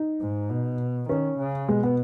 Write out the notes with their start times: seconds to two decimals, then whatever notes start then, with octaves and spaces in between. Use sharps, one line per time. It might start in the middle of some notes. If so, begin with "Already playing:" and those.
Already playing: D#4
0.21 G#2
0.50 B2
1.09 D#3 C#4
1.39 C#3
1.68 B2 G#3
1.83 B3